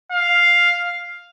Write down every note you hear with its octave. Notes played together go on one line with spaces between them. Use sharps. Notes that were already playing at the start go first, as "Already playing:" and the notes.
F5